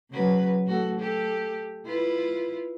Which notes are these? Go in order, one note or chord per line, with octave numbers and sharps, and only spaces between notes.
C#3 F#3 B4
A2 F#4 A4
G4 A4
E4 F4 B4